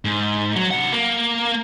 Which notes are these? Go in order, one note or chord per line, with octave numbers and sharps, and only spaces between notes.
G#2
F#3
C3 F#5
A#3